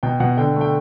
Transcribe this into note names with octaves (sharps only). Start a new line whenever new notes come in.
B2 G5
B2 F#5
D3 G5
A3
G5